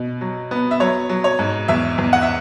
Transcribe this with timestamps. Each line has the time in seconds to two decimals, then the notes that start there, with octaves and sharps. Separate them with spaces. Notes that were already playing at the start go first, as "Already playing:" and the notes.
Already playing: B2
0.21 F#3
0.51 B3
0.71 E5
0.80 F#3 C#5
1.09 F#3
1.24 C#5
1.39 G#2
1.68 E2 E5
1.98 E2
2.13 F#5
2.22 E5